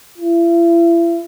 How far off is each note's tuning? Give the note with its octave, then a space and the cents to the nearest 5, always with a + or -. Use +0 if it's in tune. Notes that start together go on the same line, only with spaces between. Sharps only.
E4 +40